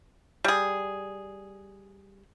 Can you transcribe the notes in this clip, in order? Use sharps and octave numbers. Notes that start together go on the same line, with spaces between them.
G3 G#4